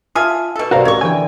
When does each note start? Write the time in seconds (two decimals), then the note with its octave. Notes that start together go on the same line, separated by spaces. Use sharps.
0.15 F4 E5 F5 G#5 A5 D#6
0.56 B2 A4
0.71 C2 F#4 A#4 C5 D5 F5
0.85 A1 C#5 C#6
1.01 D3 E3 G5 G#5